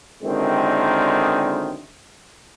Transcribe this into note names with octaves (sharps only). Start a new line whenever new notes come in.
F#2 A#2 D3 D#3 G#3 C4